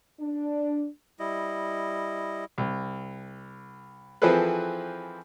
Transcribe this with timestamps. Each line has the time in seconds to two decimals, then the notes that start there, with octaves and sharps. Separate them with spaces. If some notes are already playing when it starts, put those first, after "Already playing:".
0.19 D4
1.19 G3 E4 D#5
2.58 C2
4.22 E3 F3 C4 G#4 A4 B4